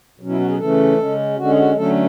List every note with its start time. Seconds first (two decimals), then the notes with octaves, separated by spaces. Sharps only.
0.20 B2 F#3 C#4
0.30 E4
0.40 F#4
0.49 G#4
0.59 C#3 E3 A3 C#4 A4
0.98 C#3 G#3 C#4
1.38 D3 G#3 C#4 F#4
1.53 G#4
1.58 F#4
1.76 D3 F#3 A3 C#4 A4